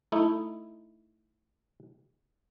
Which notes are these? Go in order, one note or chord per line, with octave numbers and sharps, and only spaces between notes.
A3 D#4 E4